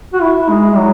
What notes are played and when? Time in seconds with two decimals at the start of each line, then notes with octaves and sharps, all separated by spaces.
0.14 F#4
0.22 E4
0.50 G#3
0.77 F#3